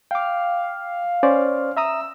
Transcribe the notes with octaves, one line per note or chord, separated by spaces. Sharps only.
F5 G5 D6
C#4 C5 D5
E5 A#5 D#6 E6